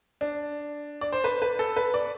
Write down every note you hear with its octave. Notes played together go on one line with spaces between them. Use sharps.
D4
D5
C5
B4
B4
A4
B4
D5